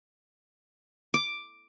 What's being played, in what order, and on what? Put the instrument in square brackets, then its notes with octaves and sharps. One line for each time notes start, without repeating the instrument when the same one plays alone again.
[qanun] D6